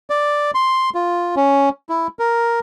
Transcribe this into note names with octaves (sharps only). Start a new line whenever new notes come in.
D5
C6
F4
C#4
E4
A#4